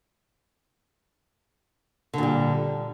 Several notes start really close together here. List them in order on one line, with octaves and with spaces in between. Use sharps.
D3 A#2 G3